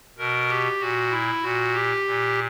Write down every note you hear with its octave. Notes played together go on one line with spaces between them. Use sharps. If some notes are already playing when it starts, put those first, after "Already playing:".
B2 A#4
G4
A#2 F#4
E4
A#2 F#4
G4
A#2